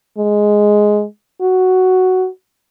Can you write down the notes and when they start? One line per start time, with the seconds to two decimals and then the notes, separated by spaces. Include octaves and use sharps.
0.18 G#3
1.41 F#4